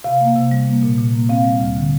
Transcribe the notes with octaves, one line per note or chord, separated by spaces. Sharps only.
C3 F5
A#3
C3
G3
A#3
A#2
A#2
A#3
C4 F5
G3
D2
D3